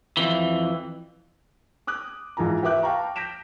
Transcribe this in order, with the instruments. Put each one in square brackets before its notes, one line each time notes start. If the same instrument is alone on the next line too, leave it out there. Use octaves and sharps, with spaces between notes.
[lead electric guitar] F2 E3
[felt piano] D6 D#6 F#6
G#2 E3 F4 A#5
G4 B4 E5 D6 F#6
F5 G5 A5 A#5 C#6
G6 A#6 B6 D7 E7